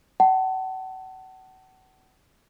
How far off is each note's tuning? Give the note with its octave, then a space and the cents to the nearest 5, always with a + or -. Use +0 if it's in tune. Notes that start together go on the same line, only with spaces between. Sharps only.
F#5 +35 A5 +0